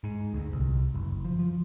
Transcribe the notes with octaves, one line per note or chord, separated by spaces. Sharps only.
G#2
D2
C2
F#1
F3
F3